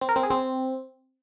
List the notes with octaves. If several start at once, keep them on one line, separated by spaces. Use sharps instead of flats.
C4
A#4
C4
G#4
C4